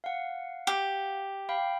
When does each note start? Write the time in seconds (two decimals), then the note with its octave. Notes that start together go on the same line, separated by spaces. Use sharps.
0.04 F5 F#5
0.67 G4
1.49 F5 G5 B5